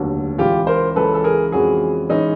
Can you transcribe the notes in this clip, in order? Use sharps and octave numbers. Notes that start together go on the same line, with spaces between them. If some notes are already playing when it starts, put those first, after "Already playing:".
Already playing: F1 D#2 D3 F#3
C#2 C#3 E3 F4 G4
A#4 C5
C#2 C#3 E3 A4 B4
A4
G#4 A#4
F2 C#3 E3 G#3 F#4 G#4
C#3 E3 G#3 C#4 D#4